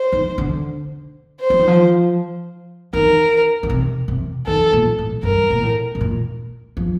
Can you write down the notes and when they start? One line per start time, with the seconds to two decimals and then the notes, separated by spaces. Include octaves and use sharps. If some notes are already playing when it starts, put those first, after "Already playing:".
Already playing: C5
0.12 D#3
0.38 D3
1.40 C5
1.50 F3
1.59 D#3
1.68 F3
2.93 D#3 A#4
3.63 D3
3.70 C3
4.08 C3
4.47 D#3 A4
4.73 A#2
4.98 A2
5.23 G2 A#4
5.50 A#2
5.62 A2
5.95 C3
6.01 A#2
6.77 F3